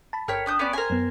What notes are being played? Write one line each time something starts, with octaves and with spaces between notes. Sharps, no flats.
A5 B5
G1 A#4 C#5 G5 B6
D4 D#6 G6
B3 C#4 D5
A#4 C5 G#5
F#2 B3